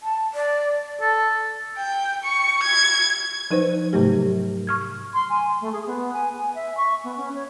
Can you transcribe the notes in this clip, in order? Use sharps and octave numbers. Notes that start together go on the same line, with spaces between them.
A5
D5
A4
G5
C#6
G#6
F3 D#4 B4 C5
G#2 C3 F#3 A3 G4
C#6 F6 G#6
C6
G#5
A3
G#4
B3
G#5
G#5
E5
C#6
B3
C#4
C#5